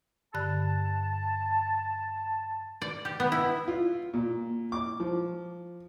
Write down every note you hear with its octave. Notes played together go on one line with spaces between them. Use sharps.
G2 D3 A5 F#6
D5
G4
B3
E4
F4
A#2
D6
F3